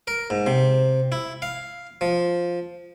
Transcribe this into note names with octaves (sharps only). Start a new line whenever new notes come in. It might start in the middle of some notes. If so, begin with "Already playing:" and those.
A#4
G#2
C3
E4
F5
F3